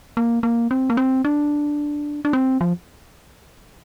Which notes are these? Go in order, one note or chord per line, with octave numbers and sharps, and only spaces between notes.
A#3
A#3
C4
A#3
C4
D4
D4
C4
F3